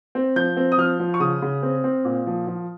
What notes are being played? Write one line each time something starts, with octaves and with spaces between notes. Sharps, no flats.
C4
F3 G6
C4
D#6
F3 F6
F3
C#6
C#3 D#6
C#3
C4
C4
A#2
F3
F3